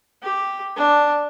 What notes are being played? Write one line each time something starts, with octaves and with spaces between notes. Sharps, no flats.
G4
D4